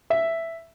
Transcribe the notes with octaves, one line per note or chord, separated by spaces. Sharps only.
E5